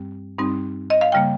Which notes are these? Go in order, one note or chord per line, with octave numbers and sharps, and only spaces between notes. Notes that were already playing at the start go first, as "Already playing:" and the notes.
Already playing: G2 G3 C4
G2 G3 C4 D#4
D#5
F5
C#3 G3 A#3 G5